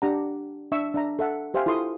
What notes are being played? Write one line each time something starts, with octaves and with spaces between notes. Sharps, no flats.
D4 G4 F#5 A#5
D4 E5 C#6 E6
D4 E5 A#5
A4 E5 F#5
G4 C5 E5 F5 G5 G#5
E4 F4 A4 C6 C#6 D#6